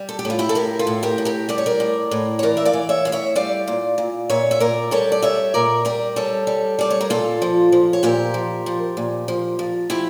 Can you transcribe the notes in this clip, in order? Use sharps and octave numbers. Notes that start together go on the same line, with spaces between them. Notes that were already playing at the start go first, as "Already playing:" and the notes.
Already playing: G3
A4
G4
A2
F4
E4 G4
A4
A2 G4 A#4
F4 A4
A2
G4 A#4
A2
G4 A#4
G3 D5
C#5
A#4 D5
A2
A2
C#5
E3 A#4 D5
E5
D5 F5
E3
C#5 E5
A2 F5
C#5 E5
G3 D5 F5
A#2
A#2
A#2 C#5 E5
E5
A#2 A#4 D5
G3 A4 C#5
D5
G3 C#5 E5
A#2 A#4 D5
G3 A#4 D5
G3 A4 C#5
G3
G3 D5
C#5
A#4
A#2 F4 A4
F3
F3
C#5
A#2 G4 A#4
F3
F3
A#2
F3
F3
F3 E4 G4